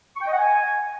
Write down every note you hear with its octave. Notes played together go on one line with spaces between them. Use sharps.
C#6
G5
D#5
F#5
G#5